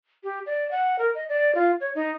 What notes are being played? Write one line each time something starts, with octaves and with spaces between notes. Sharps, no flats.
G4
D5
F#5
A#4
D#5
D5
F4
C#5
D#4